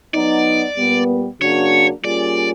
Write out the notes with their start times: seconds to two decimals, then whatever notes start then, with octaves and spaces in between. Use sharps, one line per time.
0.14 F#3 B3 D#4 D5
0.77 A#2 G3 B3
1.41 C#3 F#3 A#3 D4 F#4 C#5
2.04 G3 A#3 C#4 F4 G#4 D5